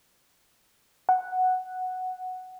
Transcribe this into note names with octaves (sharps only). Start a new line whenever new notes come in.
F#5